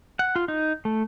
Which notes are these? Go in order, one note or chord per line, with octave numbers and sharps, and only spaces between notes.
F#5
F4
D#4
A3